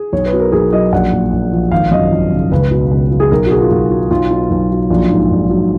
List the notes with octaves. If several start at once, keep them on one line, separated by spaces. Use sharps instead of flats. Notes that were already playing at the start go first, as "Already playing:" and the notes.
Already playing: G#4
B1 C#5
B4
B2
A#4
B1 G#4
F#3 D#5
A#1 F#5
A#2
A#1
F3
G#1 F5
F#2 D#5
F3
C#3
C#2 B4
B2
C#2
F#3
G#4
B1 A#4
F#4
B2 G#4
F4
B1 F#4
F#3
B1 F4
B2
B1
F#3
A#1 F4
G#2
A#1
F#3